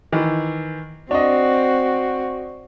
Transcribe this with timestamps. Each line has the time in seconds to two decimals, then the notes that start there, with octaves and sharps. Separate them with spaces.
0.12 D#3 E3
1.11 C4 D4 F#4 D#5